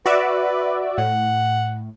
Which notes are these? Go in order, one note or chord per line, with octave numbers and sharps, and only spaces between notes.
F#4 B4 D5 E5
A2 F#5